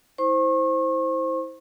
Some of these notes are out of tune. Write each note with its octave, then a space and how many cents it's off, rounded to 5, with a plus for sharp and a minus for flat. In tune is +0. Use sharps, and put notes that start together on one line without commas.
E4 -30 C5 +0 C#6 -35